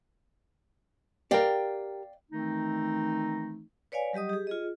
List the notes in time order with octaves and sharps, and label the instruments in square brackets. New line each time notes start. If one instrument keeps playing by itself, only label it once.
[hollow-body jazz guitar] G4 A#4 [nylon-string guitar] D5 F5 G5
[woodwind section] D#3 E3 A3 C4 D#4
[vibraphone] B4 C#5 D5 F5 G#5
F#3 G3 G4 D#5 D#6
G4 G#4
F4 G#4 D#5